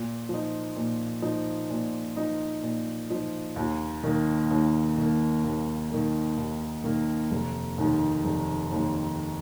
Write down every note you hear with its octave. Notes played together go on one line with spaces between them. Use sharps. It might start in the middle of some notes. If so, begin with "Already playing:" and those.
Already playing: A#2
F3 D#4
A#2
F3 D#4
A#2
F3 D#4
A#2
F3 D#4
D#2
D#3 A#3
D#2
D#3 A#3
D#2
D#3 A#3
D#2
D#3 A#3
F1
D#2 D#3
F1
D#2 D#3